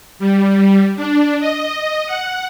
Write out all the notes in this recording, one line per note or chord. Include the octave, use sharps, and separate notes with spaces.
G3
D4
D#5
F#5